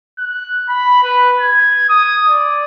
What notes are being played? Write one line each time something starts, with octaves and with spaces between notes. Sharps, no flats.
F#6
B5
B4
G#6
D#6
D5